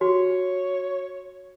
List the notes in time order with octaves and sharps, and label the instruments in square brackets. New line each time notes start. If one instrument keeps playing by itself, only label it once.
[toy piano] F#4 [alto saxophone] C#5